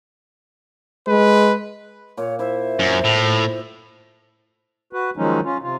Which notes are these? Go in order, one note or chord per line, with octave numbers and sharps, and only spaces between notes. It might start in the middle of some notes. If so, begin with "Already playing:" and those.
G#3 B4
A#2 C#5
E4 C5 E5
F#2
A2
F#4 B4
D#3 F3 F#3 G#3 C#4 D#4
C#4 F4
C3 F4